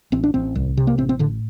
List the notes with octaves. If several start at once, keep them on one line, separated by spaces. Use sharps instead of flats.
A1 C4
D4
A1 C4
C2
C3
A#3
A1 C4
C4
A2 D3